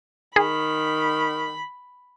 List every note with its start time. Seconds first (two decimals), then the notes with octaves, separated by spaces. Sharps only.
0.36 D#3 G#4 B5